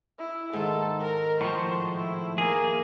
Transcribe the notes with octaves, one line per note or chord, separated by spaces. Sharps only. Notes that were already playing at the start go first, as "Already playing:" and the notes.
E4
G#2 D#3 A4
A#4
A2 F3 C5 C#6
E4
A#3 G#4